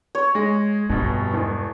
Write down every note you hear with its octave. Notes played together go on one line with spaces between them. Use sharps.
C#5
G#3 A#6
F1 G2 B2
E1 E2